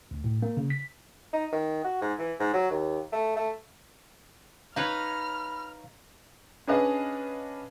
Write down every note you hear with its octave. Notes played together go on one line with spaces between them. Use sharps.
D2
A2
A#3
C#3
B6
D#4
D#3
F#4
G#2
E3
G#2
F#3
D#2
A3
A3
D#4 B4 C#5 F5 B5 F6
C#4 D4 G#4 B4 D#5 F5